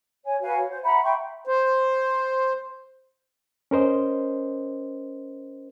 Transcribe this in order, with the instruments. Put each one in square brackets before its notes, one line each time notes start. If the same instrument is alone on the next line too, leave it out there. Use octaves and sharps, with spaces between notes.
[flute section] C#5 G#5
F#4 B4 F5 G#5
C#5
C5
E5 F#5 A#5 B5
E5 G5 C6 C#6
[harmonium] C5
[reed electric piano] C#4 A#4 C5 D#5